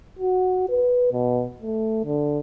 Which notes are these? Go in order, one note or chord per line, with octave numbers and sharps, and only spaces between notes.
F#4
B4
B2
A3
D3